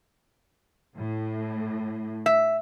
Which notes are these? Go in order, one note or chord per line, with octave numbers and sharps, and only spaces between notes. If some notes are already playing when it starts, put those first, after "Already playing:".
A2
E5